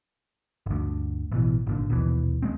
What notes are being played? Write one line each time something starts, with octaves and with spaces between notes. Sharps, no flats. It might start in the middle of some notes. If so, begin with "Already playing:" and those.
G1 D2
A1 B2 E3
G#1 A#2 D3
A#1 D#2 B2 E3
D#1 G#3 A3 C4